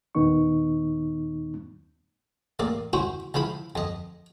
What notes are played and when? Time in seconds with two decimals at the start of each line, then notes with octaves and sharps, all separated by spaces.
0.15 D#2 A#2 D#3 B3 D#4 C#6
2.59 A1 A#3 D5
2.93 C#4 E4 F#4 C5
3.34 C#2 F3 E4 B5
3.75 F2 D#5